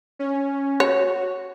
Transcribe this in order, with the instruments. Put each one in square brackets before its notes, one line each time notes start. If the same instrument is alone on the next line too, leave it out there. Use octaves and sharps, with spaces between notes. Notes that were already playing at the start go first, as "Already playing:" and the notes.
[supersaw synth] C#4
[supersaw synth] F#4 [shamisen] C#5